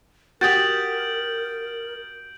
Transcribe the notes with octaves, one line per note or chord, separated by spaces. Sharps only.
F#4 G4 A#4 D#6 G6 A6 D7 F#7